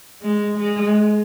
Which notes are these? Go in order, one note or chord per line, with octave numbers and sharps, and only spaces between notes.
G#3
G#3